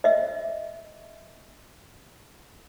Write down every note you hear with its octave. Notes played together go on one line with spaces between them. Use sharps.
D#5 E5